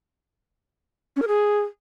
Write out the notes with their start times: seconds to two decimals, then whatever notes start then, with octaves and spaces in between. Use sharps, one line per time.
1.16 C#4
1.22 A#4
1.28 G#4